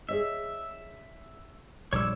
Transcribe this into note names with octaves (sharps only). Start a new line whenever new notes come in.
G#4 C#5 D#5 E5
A#1 G3 C#5 D6 E6